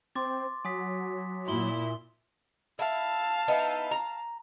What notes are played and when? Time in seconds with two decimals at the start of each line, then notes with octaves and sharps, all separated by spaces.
0.15 C4 C6 D6 A6
0.65 F#3 G#5 D#6 B6
1.48 A#2 E4 C6 G7
2.79 E4 F5 A5
3.48 B3 D#4 E4
3.91 A#5